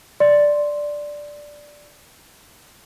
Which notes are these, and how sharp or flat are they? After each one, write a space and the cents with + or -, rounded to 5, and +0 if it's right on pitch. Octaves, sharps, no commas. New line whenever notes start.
D5 +0 C6 +0